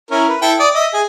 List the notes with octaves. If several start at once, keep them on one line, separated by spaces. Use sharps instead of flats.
C#4 E4 A#4
B4
E4 A4 G5
D5 D#6
D#5 E5 D#6
G#4